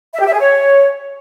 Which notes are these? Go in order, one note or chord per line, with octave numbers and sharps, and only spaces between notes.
E5
G4
E5
G#4
C#5